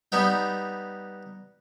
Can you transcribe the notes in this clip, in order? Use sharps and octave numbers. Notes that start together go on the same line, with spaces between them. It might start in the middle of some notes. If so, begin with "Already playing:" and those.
G3 B3 D#4 G5